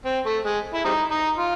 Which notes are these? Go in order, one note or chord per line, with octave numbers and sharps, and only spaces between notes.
C4
A3
G#3
E4
G3 C4 D#4
D#4
F4